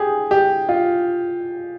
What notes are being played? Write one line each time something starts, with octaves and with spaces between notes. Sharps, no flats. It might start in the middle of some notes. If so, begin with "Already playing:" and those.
Already playing: G4 G#4
G4
F4